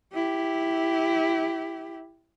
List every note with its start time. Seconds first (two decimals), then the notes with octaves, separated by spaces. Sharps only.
0.14 E4 G4